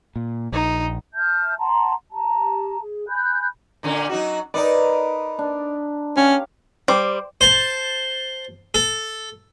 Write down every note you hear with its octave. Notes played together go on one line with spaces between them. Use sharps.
A#2
A#1 D#4
E5 A5 F6 G6
F#5 A5 A#5 C6
G4 A5 A#5
G#4
G#5 B5 F#6 G6
A#2 D3 C#4
F#3 D#4 F#4
D#4 A#4 B4 D5 D#5 A#5
D4
C#4 G4 C#5 F5
G3 C5 D6
C5 A5
A4